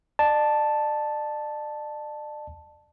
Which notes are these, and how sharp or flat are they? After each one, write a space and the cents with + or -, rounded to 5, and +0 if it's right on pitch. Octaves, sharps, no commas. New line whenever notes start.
D5 +40 A5 +0